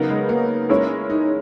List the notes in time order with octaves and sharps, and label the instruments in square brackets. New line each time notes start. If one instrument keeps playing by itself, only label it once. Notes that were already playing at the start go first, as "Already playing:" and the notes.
Already playing: [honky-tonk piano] C#3 F#3 B3 D#4 A#4
[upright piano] G#3
A#3
[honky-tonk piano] G#3 C#4 E4 A#4 C#5
[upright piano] D#4